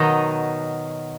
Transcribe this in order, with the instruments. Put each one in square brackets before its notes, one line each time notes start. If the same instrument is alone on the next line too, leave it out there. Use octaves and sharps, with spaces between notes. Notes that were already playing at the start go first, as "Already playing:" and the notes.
Already playing: [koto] B2 D#3 F#3 D#4